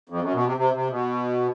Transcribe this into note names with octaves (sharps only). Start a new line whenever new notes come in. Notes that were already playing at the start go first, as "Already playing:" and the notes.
F2
F#2
B2
C3
C3
C3
B2